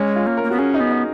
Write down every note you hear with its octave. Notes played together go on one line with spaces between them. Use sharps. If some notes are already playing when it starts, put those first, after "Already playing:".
Already playing: G#3 C#4
F4
A#3
A#4
A#3
B3 F#4
C#4 G#4
D#4
B3
D#4